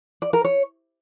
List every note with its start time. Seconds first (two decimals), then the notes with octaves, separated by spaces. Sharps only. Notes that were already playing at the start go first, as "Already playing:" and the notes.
0.22 D5
0.33 A#4
0.44 C#5